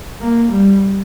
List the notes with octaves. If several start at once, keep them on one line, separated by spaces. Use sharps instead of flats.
A#3
G3